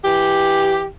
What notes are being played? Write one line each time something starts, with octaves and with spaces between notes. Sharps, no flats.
E3 G4